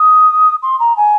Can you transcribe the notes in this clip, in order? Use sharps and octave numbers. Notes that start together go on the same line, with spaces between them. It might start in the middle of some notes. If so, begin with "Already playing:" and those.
Already playing: D#6
C6
A#5
G#5